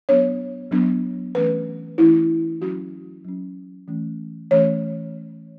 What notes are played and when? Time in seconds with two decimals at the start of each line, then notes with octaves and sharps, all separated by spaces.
0.09 F#3 B3 D4 C#5
0.71 F#3 B3 D4
1.35 E3 A3 C#4 B4
1.98 E3 A3 C#4 E4
2.61 F#3 C#4 F#4
3.24 F#3 C#4
3.88 E3 A3 C#4
4.51 E3 A3 C#4 C#5